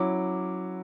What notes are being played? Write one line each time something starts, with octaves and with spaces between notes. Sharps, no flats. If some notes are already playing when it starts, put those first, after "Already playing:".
Already playing: F#3 C#4 E4 D6